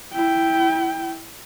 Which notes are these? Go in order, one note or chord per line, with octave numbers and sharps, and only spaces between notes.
E4 G5